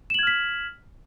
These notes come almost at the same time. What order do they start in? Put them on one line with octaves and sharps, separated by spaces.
E7 F#7 G#6 F6 B6